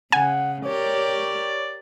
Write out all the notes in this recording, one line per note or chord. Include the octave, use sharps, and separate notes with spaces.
C#3 F#5 G#5
G4 A#4 C#5 D5